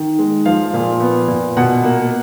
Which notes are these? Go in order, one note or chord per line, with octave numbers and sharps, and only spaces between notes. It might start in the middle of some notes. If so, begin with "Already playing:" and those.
Already playing: D#3
G#3
F3 F5
A#2
B3
A#2
B2 F#5
A#3